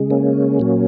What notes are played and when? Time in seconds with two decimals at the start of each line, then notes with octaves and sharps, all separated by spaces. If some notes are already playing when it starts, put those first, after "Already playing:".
Already playing: C#3 G#3
0.10 A#3 C#4
0.60 A#2 F#3